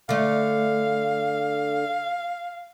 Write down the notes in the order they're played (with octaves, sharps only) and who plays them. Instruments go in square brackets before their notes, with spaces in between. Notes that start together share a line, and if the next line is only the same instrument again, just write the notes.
[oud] D3 A3 [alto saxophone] F5